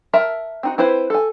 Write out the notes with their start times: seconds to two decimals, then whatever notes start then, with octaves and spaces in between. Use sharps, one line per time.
0.13 A#4 E5 A5
0.63 C4 D#4 F#4
0.78 C4 E4 B4 C5
1.10 A4 G#5